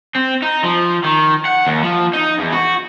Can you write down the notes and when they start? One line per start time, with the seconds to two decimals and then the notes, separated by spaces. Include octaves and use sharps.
0.15 C4
0.42 D#4
0.63 F3
1.04 D#3
1.45 F#5
1.67 D#2
1.83 F3
2.13 D#4
2.39 E2
2.52 F#4